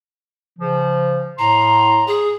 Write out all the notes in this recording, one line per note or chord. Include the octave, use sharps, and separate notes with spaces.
C#3 F3
A2 A#5 C6
G#4